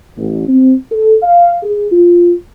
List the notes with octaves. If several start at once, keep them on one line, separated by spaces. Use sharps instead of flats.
A1
C4
A4
F5
G#4
F4